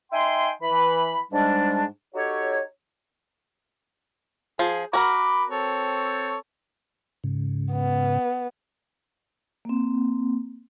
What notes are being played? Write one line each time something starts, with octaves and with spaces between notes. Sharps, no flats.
D#4 E5 G5 G#5 C6
E3 B5
G#2 G3 G#3 D4
D#4 F#4 G4 A4 C#5
F3 G#4
F#4 A#4 B5 D6
C4 A4 C#5
G#2 C#3
B3
A#3 C4